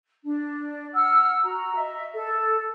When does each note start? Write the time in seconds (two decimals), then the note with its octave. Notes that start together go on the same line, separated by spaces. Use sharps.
0.24 D4
0.94 F#5 E6 F6
1.43 F#4 A#5
1.75 D#5 E5
2.13 A4